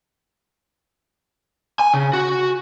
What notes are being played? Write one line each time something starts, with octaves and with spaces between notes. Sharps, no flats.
G#5
C#3
F#4